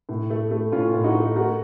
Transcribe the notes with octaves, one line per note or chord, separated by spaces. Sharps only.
A2
A3
A3
A2 C#4 F4
A2
D#4 F#4
A3
A3 F#4 A#4